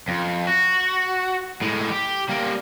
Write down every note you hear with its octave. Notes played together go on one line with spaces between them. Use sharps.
F2
F#4
A2 G#3
G4
G3 A#3